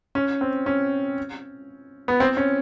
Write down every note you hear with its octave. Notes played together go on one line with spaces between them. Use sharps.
C#4
C4
C#4
B3
C4
C#4